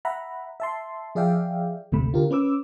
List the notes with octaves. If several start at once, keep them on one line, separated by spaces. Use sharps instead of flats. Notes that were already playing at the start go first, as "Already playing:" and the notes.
E5 F#5 A#5 B5
E5 A5 C6
F3 G#4 D5 E5 F5 G5
G#1 D2 C3 A3 B5
D3 F4 G4 A#4
C#4 B4 D6 E6